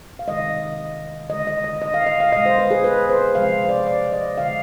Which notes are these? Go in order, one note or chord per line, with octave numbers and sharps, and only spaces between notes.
F5
C3 D#3 G#3 D#5
D3 G#3 D#5
D#5
D#5
D#5
F5
D#5
F5
B2 G#3 D#5
C5
B4
G#4
B4
C5
C3 F3 G#3 F5
C5
D5
D5
D#5
D3 G#3 F5